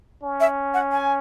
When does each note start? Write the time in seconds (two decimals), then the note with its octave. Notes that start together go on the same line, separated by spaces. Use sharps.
0.23 C#4
0.40 E5
0.74 F#5
0.92 G#5